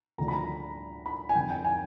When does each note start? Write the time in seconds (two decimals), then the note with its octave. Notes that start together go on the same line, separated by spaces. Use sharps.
0.18 D2 D3 F3 A#5
0.28 B5
0.33 A#5
1.06 B5
1.29 G#5
1.35 F1 F2 D3 G5
1.50 G5
1.65 G#5